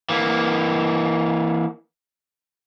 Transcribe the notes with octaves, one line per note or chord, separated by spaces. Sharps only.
E3 A#3